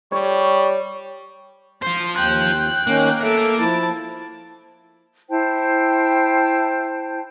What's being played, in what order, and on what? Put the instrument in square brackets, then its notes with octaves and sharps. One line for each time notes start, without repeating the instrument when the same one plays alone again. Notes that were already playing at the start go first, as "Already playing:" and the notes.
[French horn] G3 [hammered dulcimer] C#5 [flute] C#6
[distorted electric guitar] F4 C5 [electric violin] C6
[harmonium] D#2 [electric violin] G5 F#6
[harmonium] D#3 C#4 [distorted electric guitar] A#3
[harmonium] A4 E5 [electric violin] D7
[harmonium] F3 E4 [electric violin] A5
[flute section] E4 C5 G5 A5